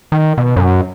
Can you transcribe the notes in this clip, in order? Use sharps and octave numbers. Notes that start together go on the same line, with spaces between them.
D#3
B2
F#2